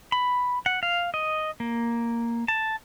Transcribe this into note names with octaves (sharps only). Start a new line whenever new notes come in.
B5
F#5
F5
D#5
A#3
A5